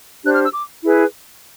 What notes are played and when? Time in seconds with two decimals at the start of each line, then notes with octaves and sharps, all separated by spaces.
0.24 D4 G4 C5 F#6
0.34 F6
0.44 E6
0.53 D6
0.83 E4 G#4 B4